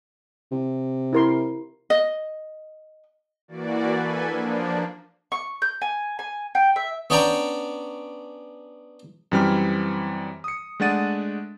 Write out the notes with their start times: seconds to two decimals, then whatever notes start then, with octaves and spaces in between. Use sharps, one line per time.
0.51 C3
1.13 E4 A#4 C6
1.90 D#5
3.48 E3 A#3 F#4 D5
3.88 A4 B4 G#5
4.24 F3 A#3 D4
5.32 C#6
5.62 G6
5.81 G#5
6.19 G#5
6.55 G5
6.76 E5
7.10 B3 C#4 D4 D5 G5 A#5
9.32 F#2 E3 G3 C4 B5 F6
10.44 D#6 C#7
10.80 G#3 A3 D4 F#5 A6 D#7